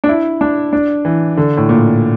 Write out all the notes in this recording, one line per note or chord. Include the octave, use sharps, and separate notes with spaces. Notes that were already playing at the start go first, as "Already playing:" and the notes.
D4
E4
D4
D4
E3
D3
A2
A#2